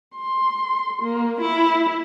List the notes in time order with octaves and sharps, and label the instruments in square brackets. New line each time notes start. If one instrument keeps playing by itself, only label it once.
[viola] C6
A#3
E4